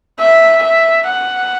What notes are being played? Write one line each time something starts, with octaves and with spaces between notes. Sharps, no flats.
E5
E5
F#5